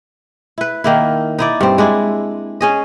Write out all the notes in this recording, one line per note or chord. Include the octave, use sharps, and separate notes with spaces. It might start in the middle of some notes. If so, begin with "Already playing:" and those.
E4 B4
D#3 A#3 E4
D#4 E4 D5
G2 C4
G#3 D4 E4
C#4 G#4 D#5